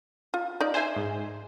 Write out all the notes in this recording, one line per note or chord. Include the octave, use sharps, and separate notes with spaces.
F4
D#4 D5
F3 C5 E5 G#5
G#2